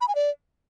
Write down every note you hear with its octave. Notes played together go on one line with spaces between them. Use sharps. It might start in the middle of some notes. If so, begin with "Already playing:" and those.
B5
G#5
D5